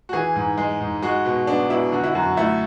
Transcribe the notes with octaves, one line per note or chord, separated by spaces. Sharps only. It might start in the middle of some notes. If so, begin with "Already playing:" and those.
F#4
E3 G#4
G#2
G#3
G#2
G#3 F#4
B2
B3 D4
B2 E4
D3 F#4
E4
F#2 F#4
A3 E4